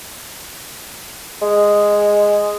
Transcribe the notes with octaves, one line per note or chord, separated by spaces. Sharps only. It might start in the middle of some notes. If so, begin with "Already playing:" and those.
G#3